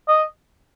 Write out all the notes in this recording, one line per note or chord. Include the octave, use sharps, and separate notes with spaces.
D#5